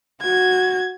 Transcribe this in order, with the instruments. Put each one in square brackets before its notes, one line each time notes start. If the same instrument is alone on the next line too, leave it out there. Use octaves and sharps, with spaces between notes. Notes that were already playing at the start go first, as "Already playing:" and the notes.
[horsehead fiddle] F#4 [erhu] G#6